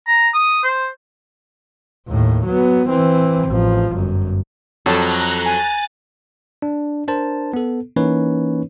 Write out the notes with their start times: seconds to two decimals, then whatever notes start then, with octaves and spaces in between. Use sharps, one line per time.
0.07 A#5
0.34 D#6
0.64 C5
2.08 D#2 A2
2.46 F#3 B3
2.89 E3 C4
3.48 A1 F3
3.93 G1 F#2
4.86 F2 F#3 A4 A#5 F#6
5.45 G#5 A6
6.62 D4
7.08 D4 A#4 C5 A5
7.54 B3 A4
7.96 E3 A#3 C#4 D#4 B4 C#5